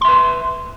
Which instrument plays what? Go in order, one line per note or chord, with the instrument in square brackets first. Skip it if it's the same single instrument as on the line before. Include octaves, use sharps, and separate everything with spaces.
[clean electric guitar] C6
E5
B4